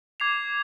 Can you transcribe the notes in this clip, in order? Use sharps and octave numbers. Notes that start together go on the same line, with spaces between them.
D6 G#6 C7 F7